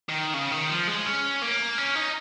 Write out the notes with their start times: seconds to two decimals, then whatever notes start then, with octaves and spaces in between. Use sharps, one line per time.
0.09 D#3
0.34 C#3
0.52 D#3
0.69 F3
0.88 G#3
1.05 C#4
1.42 A#3
1.78 C#4
1.95 D#4